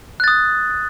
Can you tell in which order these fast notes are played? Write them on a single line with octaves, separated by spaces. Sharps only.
F#6 A6 D#6